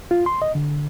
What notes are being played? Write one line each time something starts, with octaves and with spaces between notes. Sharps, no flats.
F4
C6
D#5
D3